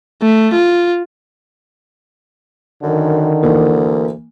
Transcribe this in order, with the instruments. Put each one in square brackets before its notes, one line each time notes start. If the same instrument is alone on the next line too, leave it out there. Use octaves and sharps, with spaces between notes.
[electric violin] A3
F4
[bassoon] F#2 [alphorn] D3 [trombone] D#3
[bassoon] D2 [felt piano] E3 A#3